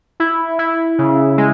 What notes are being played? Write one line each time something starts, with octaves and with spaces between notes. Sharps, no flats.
E4
E4
C#3
G#3